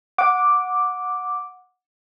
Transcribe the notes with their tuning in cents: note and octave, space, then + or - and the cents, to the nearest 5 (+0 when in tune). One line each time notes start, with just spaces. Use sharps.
F#5 -15 D6 +0